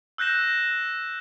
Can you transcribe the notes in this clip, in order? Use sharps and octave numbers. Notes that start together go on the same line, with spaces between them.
E6 F#6 G6 A#6 E7